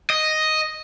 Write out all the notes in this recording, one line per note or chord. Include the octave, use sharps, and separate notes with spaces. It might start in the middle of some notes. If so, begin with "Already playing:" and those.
D#5